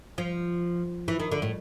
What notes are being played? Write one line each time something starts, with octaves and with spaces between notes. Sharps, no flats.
F3
E3
D#3
D3
A2